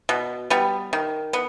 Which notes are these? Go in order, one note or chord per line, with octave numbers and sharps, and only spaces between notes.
B2
G3 B3
D#3
B3